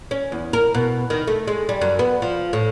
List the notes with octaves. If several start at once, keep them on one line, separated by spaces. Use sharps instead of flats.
C#4
E2
A#4
B2
D#3
A3
G#3
G3
F#2
B3
F3
A2